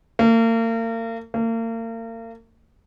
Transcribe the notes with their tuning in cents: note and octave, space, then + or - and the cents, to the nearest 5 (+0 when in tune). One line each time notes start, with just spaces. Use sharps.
A#3 -40
A#3 -40